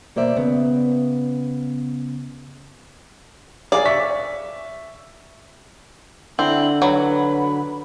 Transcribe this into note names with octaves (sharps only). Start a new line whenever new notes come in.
B2 A#3 C5 D5 E5
C#3 B3
G#4 D5 F5
E5 C#6 B6
D3 C4 E4 F#7
F#3 B4 B5